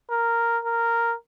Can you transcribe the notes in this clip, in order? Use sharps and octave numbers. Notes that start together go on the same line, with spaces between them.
A#4
A#4